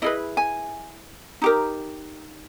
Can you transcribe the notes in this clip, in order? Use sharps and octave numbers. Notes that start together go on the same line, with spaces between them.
E4 G#4 B4 D#5
G#5
D#4 G4 A#4